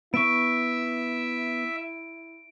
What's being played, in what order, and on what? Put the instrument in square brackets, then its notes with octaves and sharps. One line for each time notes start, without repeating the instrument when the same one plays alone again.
[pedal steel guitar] B3 C#6 [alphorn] E4 [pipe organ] E5 [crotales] D7